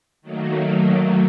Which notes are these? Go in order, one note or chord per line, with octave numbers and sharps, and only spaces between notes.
D#3 F#3 A3 A#3